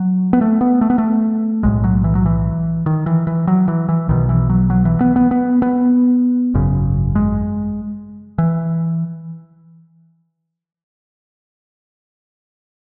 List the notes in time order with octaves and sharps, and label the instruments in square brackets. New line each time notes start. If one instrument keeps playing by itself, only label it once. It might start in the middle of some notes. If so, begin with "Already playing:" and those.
Already playing: [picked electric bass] F#3
B3
A3
B3
A3
B3
A3
B1 A2 G#3
F#3
E3
F#3
E3
D#3
E3
E3
F#3
E3
E3
B1 B2 D#3
E3
F#3
F#3
E3
B3
B3
B3
B3
G#1 F#2 C#3
G#3
E3